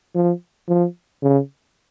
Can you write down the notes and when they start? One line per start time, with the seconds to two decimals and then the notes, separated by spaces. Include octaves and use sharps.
0.15 F3
0.68 F3
1.22 C#3